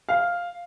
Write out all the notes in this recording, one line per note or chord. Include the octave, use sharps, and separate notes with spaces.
F5